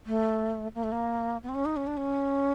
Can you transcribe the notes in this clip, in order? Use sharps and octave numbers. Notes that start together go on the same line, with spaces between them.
A3
A#3
A3
A#3
B3
C4
C#4
D#4
C#4
D4
C#4